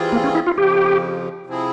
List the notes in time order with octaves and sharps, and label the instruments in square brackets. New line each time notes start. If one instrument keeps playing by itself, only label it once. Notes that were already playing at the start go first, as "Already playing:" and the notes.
Already playing: [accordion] E3 G3 C4 F4 G#4
[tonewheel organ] A#3
C#4
E4
F4
[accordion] F2 C#3 F3 [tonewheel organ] G4
[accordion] C3 F3 C4 E4 G#4